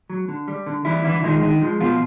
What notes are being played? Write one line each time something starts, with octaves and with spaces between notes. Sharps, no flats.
F#3
D3
G3
D3
E3 G3 E4
D3 E3 E4
D#3 F3 G#3 D#4
D3 D#3 D#4
F3 G#3
B2 F3 F4